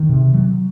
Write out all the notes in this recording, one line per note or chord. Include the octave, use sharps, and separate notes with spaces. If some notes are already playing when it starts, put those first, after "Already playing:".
Already playing: D#3
C3
F#3